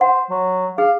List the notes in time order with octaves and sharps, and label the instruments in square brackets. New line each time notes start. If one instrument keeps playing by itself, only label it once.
[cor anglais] C5 [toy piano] F#5
[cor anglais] F#3
[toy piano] G#4 [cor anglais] F5